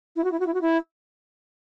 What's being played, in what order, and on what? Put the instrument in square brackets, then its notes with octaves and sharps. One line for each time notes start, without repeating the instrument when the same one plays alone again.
[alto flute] E4
F#4
E4
F#4
E4
F#4
E4